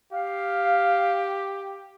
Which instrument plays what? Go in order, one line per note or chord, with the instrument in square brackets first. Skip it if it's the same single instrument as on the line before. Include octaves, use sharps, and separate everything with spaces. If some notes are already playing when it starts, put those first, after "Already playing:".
[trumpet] G4 [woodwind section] F5